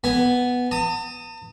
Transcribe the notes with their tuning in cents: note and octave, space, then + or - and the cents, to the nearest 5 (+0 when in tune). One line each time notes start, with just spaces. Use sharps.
B3 +0 G#5 +0
A5 +45 D#6 +5